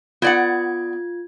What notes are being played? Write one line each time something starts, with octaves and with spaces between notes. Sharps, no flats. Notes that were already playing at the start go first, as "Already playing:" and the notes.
B3 F4 D5 F#5 G#6